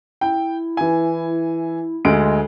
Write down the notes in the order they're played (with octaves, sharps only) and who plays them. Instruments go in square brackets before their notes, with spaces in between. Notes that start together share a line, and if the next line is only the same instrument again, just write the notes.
[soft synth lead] E4 [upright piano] G5
[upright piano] E3 G#5
[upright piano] D2 G#3 D7 [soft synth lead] D#5